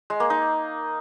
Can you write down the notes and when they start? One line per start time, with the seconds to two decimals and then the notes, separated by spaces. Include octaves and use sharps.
0.10 G#3
0.20 A#3
0.30 D#4